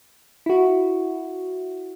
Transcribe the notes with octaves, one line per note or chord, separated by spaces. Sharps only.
E4 F#4